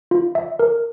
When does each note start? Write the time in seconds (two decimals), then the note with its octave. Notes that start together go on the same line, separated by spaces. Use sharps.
0.11 F4
0.35 E5
0.59 A#4